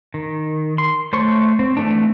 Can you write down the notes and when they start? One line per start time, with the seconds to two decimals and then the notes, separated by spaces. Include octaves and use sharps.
0.14 D#3
0.78 C6
1.13 A3 C5 C#5 C#6
1.59 C4
1.77 E3 A3 D4